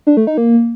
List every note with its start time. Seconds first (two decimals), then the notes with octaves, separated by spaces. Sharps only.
0.07 D4
0.17 A3
0.27 D#4
0.38 A#3